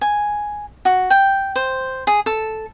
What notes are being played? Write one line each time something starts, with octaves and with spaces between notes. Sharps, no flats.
G#5
F#4
G5
C5
G#4
A4